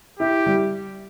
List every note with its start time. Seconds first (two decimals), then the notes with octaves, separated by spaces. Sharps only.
0.19 E4 G4
0.46 G3